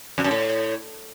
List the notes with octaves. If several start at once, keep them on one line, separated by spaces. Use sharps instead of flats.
F2
F#2
A2